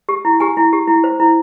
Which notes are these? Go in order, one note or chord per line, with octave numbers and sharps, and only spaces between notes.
G4
E4
G4 G#5
E4
G4
E4
C5
E4